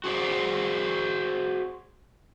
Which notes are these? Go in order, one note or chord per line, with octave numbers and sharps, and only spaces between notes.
F#4 G#4 C5 D5